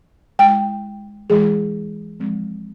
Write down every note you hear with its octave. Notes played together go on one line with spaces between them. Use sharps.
G#3 E4 G5
E3 G#3 E4 G#4
F3 G#3 C4